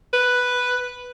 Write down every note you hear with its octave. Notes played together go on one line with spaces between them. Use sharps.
B4